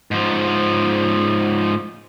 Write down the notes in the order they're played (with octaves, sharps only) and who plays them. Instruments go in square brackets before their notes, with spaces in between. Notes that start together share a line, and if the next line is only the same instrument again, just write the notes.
[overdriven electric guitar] G#2 F3